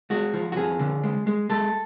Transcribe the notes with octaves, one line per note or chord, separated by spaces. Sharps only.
G#3 F#4
F3
F#4
F2 G#4
D3
G#3
G#3
G#3 A4